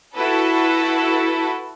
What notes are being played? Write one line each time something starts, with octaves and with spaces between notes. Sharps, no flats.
E4 F#4 A4 B4